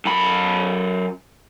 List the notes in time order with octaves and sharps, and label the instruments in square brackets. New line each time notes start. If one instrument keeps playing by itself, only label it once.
[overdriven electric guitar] F#2 B5